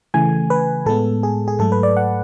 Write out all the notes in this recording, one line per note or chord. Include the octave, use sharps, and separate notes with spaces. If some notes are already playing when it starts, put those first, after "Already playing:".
C#3 E3 A3 G#5
B4
A2 G#3 B3 A4
G#4
G#4
G#2 F#3 A3 A4
B4
D5
F#5